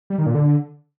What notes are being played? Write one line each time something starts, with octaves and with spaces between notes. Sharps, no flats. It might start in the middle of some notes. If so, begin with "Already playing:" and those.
G3
D#3
A#2
D3